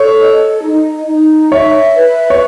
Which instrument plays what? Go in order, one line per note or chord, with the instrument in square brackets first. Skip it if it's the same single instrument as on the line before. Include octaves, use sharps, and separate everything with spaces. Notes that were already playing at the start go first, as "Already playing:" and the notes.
Already playing: [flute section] A4 [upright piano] C#5
[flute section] D#5
D#4
D#4
[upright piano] C#5 [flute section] E5
[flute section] B4
[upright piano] C#5